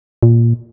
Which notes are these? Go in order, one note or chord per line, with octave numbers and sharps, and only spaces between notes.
A#2